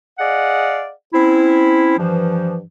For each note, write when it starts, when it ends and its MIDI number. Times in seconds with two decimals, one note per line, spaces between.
0.19 0.91 68
0.19 0.91 74
0.19 0.91 75
0.19 0.91 77
0.19 0.91 78
1.13 1.95 60
1.13 1.95 61
1.13 1.95 64
1.97 2.62 43
1.97 2.62 52
1.97 2.62 53